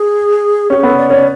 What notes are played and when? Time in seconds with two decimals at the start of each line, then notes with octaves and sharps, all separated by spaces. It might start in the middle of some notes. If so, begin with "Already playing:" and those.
Already playing: G#4
0.70 C#4 G4
0.78 G#4
0.83 B3 A4
0.97 D5
1.10 C#4 D5